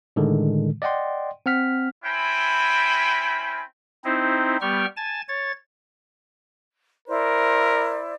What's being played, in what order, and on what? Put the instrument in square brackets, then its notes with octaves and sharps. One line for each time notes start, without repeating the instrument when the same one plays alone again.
[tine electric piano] A2 D3 D#3 G#3
D5 D#5 F#5 G5 C6
C4 F#5 F6 B6
[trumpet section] C4 C#4 E4 G5 G#5 B5
[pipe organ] C4 D#4 E4 C5
G3 B3 G4 G5 C#6 F6
G#5 A5 A6
C#5 A6
[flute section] E4 C5 D5 [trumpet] A#4